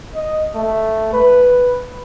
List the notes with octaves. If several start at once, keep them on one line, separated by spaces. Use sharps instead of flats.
D#5
A3
B4